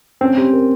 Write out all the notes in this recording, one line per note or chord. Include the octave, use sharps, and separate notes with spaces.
C4 C#4
G4
A#4